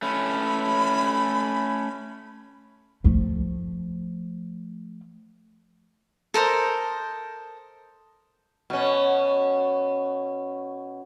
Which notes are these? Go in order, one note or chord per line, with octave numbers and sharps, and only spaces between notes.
A3 C#4 B5
F3 A3
A4 A#4 C5 D#5
B2 C#4